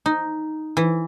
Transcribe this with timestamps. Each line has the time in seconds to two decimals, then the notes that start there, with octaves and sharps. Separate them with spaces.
0.06 D#4
0.77 E3